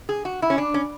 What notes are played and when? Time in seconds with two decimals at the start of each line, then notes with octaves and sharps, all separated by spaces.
0.09 G#4
0.25 F#4
0.42 E4
0.50 C#4
0.58 D4
0.74 C#4